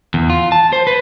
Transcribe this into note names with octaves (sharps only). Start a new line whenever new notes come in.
E2
F4
A5
C5
B4